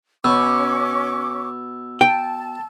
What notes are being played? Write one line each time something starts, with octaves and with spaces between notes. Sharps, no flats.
B2 C#4 C#6 D6 E6
G5 A5